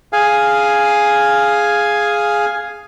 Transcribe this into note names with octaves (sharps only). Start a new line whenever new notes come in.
G#4 F5 G#5